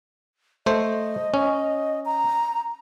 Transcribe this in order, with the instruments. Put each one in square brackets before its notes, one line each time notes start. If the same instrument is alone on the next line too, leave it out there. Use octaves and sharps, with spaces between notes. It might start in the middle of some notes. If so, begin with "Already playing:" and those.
[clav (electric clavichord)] A3 C5 [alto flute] D#5
[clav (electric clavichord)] C#4
[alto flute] A#5